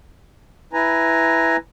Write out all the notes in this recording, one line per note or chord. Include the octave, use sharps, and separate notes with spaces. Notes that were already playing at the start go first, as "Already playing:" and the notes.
E4 B4 G#5 A#5